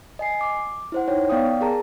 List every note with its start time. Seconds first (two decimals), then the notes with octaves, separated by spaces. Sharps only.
0.19 D#5 G#5 C7
0.41 D6
0.92 E4 C5 F#5
1.08 D#4 C#5 G5
1.29 B3 D5 F5 G5 D#6
1.61 G#4 A#4 A5 A#5